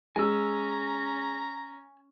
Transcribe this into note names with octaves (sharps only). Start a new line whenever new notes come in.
G#3 C#4 G#5 A#5 E6